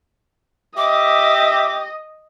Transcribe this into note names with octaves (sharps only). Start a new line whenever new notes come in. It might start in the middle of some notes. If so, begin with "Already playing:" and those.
G4 D#5 E5 D6